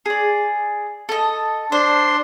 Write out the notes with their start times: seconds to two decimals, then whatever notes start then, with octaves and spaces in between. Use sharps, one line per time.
0.05 G#4 D5
1.09 A4 D#5
1.72 D4 C5 C6